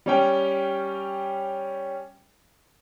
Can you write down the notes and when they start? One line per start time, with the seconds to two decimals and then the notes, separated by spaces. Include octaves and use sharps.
0.06 G3 C#4 G5